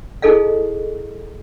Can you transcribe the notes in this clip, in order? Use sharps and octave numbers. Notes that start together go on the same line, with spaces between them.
D#4 E4 G#4 A4 D#5 F5